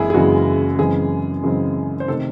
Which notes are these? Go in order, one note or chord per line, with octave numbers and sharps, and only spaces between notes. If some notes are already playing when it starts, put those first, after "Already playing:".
Already playing: F#1 F#2 C#3 E3 G#3 E4 G#4
G#4
F#1 F#2 C#3 E3 G#3 F#4
F#2 C#3 E3 G#3 C4 G#4
F#2 C#3 E3 G#3 C4
C5
C3 D#3 A3 A4